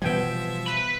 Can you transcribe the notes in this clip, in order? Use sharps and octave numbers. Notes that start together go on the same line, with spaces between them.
B2 E3 F3 G3 B3 E5 G5 G#5
B4 B5